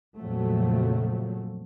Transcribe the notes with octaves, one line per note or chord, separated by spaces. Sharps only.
F2 A#2 C#3 F3 F#3 A3